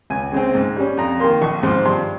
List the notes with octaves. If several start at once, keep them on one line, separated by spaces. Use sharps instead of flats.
C#2 G#5
C#3 G#3 C4
G#2
G3 C#4
F2 A#5
D#3 A#3 C6
A#1 C#6
G#2 F3 C6
G2 C6